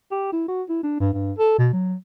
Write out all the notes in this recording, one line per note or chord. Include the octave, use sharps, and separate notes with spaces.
G4
E4
F#4
E4
D4
G2
G2
A4
B2
F#3